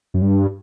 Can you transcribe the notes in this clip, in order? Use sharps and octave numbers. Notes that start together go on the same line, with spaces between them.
F#2
G2